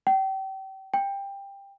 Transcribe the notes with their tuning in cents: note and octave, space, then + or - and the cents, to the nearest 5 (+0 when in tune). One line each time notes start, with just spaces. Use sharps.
G5 -35
G5 +15